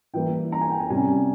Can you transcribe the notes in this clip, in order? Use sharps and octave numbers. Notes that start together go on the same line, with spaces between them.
E3 G3 A#3 G5
A#5
G#5
G5
G#5
C3 G3 C#4 G#5